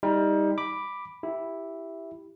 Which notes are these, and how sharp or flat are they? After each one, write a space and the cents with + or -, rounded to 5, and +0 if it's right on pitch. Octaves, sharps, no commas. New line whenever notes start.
G3 +25 D#4 +30
B5 +0 D6 +5
E4 +0 G4 +0